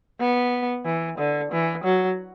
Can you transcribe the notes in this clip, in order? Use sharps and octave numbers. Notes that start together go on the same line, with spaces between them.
B3
E3
D3
E3
F#3